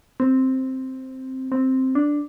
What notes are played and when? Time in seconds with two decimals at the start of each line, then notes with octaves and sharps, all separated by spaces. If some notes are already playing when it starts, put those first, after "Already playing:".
0.20 C4
1.52 C4
1.95 D4